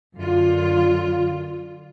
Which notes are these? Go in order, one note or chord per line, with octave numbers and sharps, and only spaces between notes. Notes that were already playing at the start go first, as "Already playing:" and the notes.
F#2 D3 F4